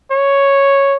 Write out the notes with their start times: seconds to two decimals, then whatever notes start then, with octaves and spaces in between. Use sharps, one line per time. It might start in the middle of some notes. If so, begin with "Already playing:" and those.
0.11 C#5